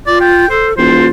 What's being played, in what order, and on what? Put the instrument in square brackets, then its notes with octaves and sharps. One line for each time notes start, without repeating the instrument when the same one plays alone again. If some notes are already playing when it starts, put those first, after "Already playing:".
[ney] F4 [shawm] D5
[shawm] G5
[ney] A4 [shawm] C5
[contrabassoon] E1 [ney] F4 [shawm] C5